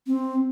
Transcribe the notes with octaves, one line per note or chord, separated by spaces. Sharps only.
C4